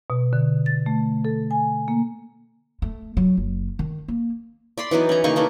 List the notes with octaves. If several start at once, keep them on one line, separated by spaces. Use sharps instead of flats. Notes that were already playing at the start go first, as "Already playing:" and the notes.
B2
D3
A6
A3
A4
G#5
A#3
A3
F#3
F#1
D#3
A#3
D5 B5 C6
E3 F#3 B3 D#4
C#4 A#5
C#3 A#3 D#4 C#6
E3 A3 A#3